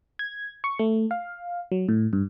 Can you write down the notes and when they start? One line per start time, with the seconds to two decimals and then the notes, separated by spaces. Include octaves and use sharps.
0.19 G#6
0.64 C#6
0.79 A3
1.11 F5
1.72 F#3
1.89 A2
2.13 G2